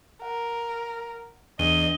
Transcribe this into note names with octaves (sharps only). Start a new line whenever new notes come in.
A#4 F#5
E2 D4 D#5 D#7 G7